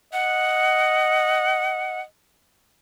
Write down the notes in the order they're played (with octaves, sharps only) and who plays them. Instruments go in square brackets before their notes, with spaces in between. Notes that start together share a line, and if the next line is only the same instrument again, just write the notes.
[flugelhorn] D#5 [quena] F#5